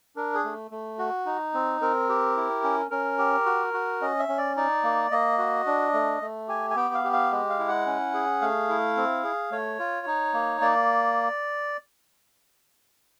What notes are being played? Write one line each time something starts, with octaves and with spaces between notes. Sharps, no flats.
D4 A#4
G#4
A3
A3
F#4
D#4
C4
C4 A#4
G4
E4
C#4
C#4 A#4
G4
F#4
F#4
C#4 D#5
E5
C#4
D5
D#4 D5
A#3
A#3 D#5
F#4
D4
A3
A3
G4 G#5
G#5
B3 G5
F5
G4
F5
G#3
F5
E4
F#5
C#4
G#4
A3 F5
E4
C4
G#4
A3 C#5
F4
D#4
A#3
A#3 D5